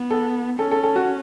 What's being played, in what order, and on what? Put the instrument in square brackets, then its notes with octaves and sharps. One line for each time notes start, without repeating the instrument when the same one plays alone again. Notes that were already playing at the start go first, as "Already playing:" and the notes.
Already playing: [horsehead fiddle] B3
[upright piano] A4
[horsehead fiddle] C#4 [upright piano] A4
[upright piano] A4
A4
F#4